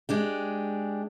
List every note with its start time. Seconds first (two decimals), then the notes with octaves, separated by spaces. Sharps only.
0.09 G#3 D4 G4